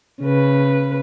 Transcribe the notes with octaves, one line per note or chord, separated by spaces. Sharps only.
C#3 B4